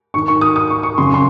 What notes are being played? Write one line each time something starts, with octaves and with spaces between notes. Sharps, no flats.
G#2 D#3 C#6
C#6
D#6
D#6
C#6
C#6
F#2 C#3 C6
C6